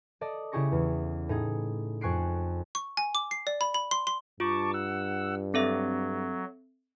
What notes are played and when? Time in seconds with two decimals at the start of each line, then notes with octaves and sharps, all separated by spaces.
0.21 A4 D5 D#5
0.52 C#3 E4 G4 G#4 C#6 A#6
0.72 E2
1.29 A2 D#4 G#4
2.01 F2 G#5 C#6 F#6 C7 D7
2.75 C#6
2.97 G#5
3.15 D6
3.31 C7
3.47 D5
3.61 B5
3.74 B5
3.91 C6
4.07 C6
4.40 G2 F4 A5 C#6 D6
4.73 F#5 E6
5.54 F#3 C4 A4 E5